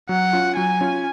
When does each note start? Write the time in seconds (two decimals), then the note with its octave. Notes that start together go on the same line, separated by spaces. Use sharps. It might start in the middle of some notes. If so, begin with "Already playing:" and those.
0.09 F#3 F#5
0.33 C#4 F4
0.57 F#3 G#5
0.81 C#4 F4